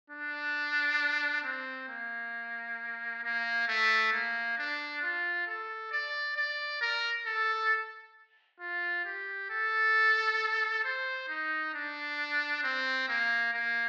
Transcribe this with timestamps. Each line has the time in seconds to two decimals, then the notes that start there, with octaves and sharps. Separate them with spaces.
0.10 D4
1.44 C4
1.89 A#3
3.24 A#3
3.68 A3
4.13 A#3
4.58 D4
5.02 F4
5.47 A4
5.92 D5
6.37 D5
6.82 A#4
7.26 A4
8.60 F4
9.05 G4
9.50 A4
10.84 C5
11.29 D#4
11.74 D4
12.64 C4
13.08 A#3
13.54 A#3